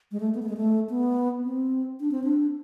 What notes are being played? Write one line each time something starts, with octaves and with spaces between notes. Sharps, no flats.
G#3
A3
B3
A3
G#3
A3
B3
C4
D4
C4
D4